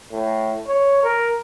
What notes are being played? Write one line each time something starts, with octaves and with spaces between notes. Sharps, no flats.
A2
C#5
A#4